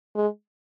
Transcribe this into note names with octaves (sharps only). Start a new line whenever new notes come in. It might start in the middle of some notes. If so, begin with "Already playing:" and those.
G#3